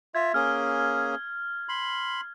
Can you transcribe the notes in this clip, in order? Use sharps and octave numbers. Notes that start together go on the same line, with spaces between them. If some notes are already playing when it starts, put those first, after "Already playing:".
F4 E5 G#6
A#3 C#4 G#4 F6
B5 C6